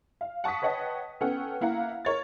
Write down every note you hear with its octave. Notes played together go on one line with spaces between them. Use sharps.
F5
F#5 A5 C#6 D#6 B6
B4 C#5 D#5 F#5 G5 A5
B3 C#4 A4 F#5 G5
A#3 E4 F5 F#5 A#5
A#4 C#5 A6